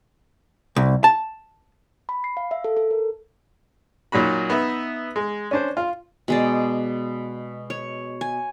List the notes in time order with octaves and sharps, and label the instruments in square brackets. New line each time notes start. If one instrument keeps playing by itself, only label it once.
[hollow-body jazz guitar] C2
A5
[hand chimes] B5
C7
F5
E5
A4
A4
A#4
[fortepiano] A#2 F#3 D#4 F#4 B5
B3 D#4 E5
G#3
C#4 D4 C5
F4
[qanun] B2 G#3 D5
C#5
G#5